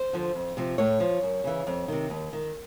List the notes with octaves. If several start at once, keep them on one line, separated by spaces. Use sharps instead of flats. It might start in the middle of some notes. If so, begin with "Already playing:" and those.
Already playing: C5
D3 F3
F2
C3 F3
A2 C#5
F3
F#2
C#3 E3
F2
C3 D#3
D#2
D#3